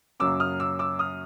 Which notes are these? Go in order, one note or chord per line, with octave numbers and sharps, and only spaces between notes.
F#2 C#3 F#3 A#3 C#4 D6 E6
D#6 F6
D6 E6
D6 E6
D#6 F6